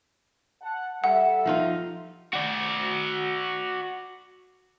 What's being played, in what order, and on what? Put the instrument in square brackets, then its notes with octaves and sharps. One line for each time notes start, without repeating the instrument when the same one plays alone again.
[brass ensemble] F#5 A5
[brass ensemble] G3 A4 E5 [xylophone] F#5
[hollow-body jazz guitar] F3 D#4 F4
[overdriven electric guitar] F#4 D5